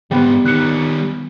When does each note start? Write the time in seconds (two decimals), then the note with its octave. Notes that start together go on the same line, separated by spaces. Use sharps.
0.11 G#2 G3 B3 C4
0.45 D#3 G3 F#6 C#7